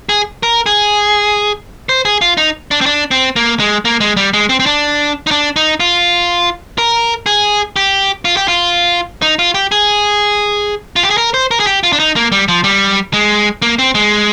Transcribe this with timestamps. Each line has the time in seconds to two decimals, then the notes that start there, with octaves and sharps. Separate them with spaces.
0.09 G#4
0.43 A#4
0.66 G#4
1.89 C5
2.05 G#4
2.21 F4
2.37 D#4
2.71 D4
2.81 C4
2.86 D4
3.11 C4
3.36 A#3
3.60 G#3
3.85 A#3
4.00 G#3
4.17 G3
4.33 G#3
4.49 C4
4.60 C4
4.66 D4
5.27 D#4
5.31 D4
5.56 D#4
5.80 F4
6.78 A#4
7.26 G#4
7.76 G4
8.25 F4
8.37 G4
8.48 F4
9.22 D#4
9.39 F4
9.54 G4
9.72 G#4
10.96 F4
11.03 G4
11.10 G#4
11.18 A#4
11.34 C5
11.51 A#4
11.60 G#4
11.67 G4
11.83 F4
11.93 D4
11.99 D#4
12.16 A#3
12.32 G3
12.48 F3
12.64 G3
13.13 G#3
13.62 A#3
13.79 C4
13.95 G#3